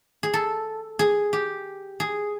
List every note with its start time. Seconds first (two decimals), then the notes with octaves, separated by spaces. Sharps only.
0.23 G#4
0.34 A4
0.99 G#4
1.33 G4
2.00 G#4